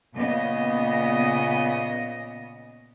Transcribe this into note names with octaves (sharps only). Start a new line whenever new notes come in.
A#2 C#3 B3 D#5